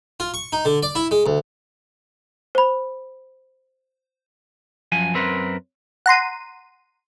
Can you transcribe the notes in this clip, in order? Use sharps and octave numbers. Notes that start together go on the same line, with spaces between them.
F4
C#6
D#4
D3
D5
E4
G#3
D2
C5 B5
F#2 F3 G#5
F#2 C4 A#4 B4
F#5 A#5 C6 D#7